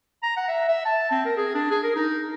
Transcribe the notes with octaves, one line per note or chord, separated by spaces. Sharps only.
A#5
F#5
E5
E5
A5
C4
A#4
G#4
D4
G#4
A#4
D#4